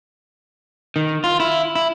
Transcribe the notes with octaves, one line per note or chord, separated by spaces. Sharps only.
D#3
F4
E4
E4